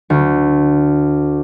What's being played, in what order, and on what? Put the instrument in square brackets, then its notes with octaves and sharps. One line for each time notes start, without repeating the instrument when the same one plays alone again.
[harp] D2